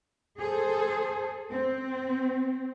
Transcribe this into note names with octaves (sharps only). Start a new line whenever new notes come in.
G#4 A4 C5
C4